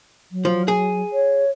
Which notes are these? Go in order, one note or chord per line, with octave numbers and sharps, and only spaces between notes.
F#3
F3
G#4
C#5